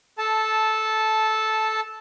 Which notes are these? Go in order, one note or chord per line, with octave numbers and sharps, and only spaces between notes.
A4 A5